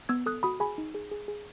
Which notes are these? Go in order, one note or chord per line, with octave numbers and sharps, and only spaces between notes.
B3 E6 G#6
A4 D#6 F#6
F#4 B5 D#6
G#4 G#5 B5
D#4
G#4
G#4
G#4